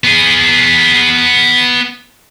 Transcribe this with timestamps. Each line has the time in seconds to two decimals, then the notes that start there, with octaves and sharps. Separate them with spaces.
0.04 B3 G#4